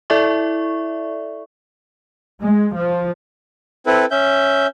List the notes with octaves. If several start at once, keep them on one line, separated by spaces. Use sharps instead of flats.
E4 A4 D5 E5 C#6
G#3
F3
C4 E4 A4 B4
C#4 E5 G6